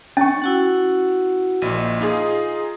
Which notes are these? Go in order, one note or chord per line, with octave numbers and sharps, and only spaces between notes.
C#4 C#6 A6
E4 F#4 F#5
A#1 A#2 D#5
D#4 F4 G#4